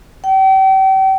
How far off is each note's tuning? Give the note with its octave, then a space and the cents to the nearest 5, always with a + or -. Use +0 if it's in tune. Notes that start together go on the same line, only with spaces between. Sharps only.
G5 -40